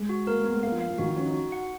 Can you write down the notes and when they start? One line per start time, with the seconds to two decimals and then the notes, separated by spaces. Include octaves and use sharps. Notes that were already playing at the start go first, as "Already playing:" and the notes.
Already playing: G#3
0.09 F#4
0.27 A#3 A#4
0.39 G#3
0.44 B3
0.51 G#3
0.63 A#3 F5
0.72 F3
0.81 F5
0.90 F3
0.98 D#3 F#4
1.08 F3
1.17 C#4 F#4
1.26 D#4
1.34 F#4
1.52 F#5